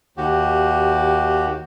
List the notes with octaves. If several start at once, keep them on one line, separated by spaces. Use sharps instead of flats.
D#2 F#4 G4